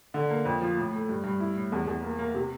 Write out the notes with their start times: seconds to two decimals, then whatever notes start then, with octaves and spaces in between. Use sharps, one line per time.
0.14 D3
0.30 A#3
0.45 F2
0.61 F3
0.77 A2
0.93 A3
1.09 G2
1.24 G2
1.40 E4
1.56 A2
1.72 E2
1.87 E2
2.03 A#3
2.19 A#3
2.34 C3